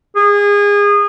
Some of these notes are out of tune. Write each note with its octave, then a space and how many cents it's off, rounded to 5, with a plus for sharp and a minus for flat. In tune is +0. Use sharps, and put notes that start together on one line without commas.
G#4 -25